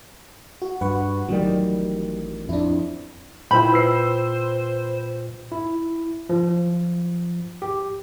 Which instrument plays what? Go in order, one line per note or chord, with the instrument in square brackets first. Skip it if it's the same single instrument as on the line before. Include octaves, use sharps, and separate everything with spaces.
[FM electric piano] F#4
[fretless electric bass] G2 [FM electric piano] B4 F#5 C#6
[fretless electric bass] A1 D#3 G3 [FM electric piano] F#3
[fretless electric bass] F2 [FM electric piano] D4 E4
[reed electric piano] A#2 F4 G5 [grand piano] E4 G6 [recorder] C5 [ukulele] B5
[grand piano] B4 E6 C7
[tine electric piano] E4
F3
G4